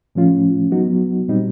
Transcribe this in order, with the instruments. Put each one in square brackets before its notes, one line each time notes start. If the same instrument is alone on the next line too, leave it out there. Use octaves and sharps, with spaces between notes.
[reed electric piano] A2 F3 A3 C#4 F4
F#3 B3 D#4 F#4
A#2 G3 C4 D#4